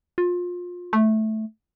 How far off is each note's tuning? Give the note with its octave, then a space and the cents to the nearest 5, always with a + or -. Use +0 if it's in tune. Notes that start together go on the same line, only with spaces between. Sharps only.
F4 +25
A3 -10